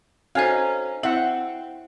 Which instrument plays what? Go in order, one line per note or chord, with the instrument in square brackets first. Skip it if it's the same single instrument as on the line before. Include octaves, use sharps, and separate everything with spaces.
[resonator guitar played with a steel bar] C#4 D#4 [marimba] F#4 A4 C5 [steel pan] F5 G#5
[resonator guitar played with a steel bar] C4 [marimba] E4 [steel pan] E5 F#5